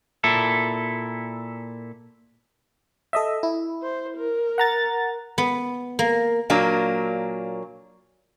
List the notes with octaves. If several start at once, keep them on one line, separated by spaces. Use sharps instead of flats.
A#2 E4 A4
A4 D#5 E5
E4
C5
A#4
F#5 A#5 A6
B3
A#3
A#2 F#3 A#3 D4